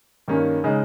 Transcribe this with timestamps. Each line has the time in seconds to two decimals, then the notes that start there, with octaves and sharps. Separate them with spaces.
0.28 G2 D#3 A#3 C#4
0.64 C#3 G#3 D#4